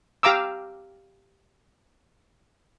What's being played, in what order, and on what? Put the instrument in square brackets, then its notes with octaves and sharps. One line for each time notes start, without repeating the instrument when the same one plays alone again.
[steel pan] G4 F5 A#5 D6 E6